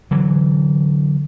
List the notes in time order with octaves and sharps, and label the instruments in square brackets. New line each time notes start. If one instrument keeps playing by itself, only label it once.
[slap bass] D3 E3 F#3